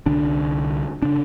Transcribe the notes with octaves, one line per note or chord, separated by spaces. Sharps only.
C2 D3 D4
C#3 D4